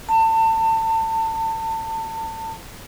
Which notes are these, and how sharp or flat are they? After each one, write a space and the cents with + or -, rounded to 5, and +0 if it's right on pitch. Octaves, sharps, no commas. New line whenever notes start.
A5 +30